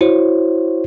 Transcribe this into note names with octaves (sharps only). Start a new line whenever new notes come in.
E4 F#4 C5 C#5